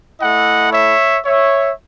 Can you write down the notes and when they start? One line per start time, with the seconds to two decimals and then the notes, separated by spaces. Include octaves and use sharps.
0.21 A3 E4 D#5 F#5
0.72 C#5 E5
1.25 C#5 E5